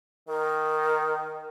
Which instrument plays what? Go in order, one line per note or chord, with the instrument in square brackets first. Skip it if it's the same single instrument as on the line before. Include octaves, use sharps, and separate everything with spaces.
[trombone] D#3 [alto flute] A#4